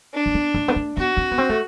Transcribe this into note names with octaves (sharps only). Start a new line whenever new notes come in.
D4
A3
B3
A3
B3
A3
B3 F#4
C4
B3
C4
A3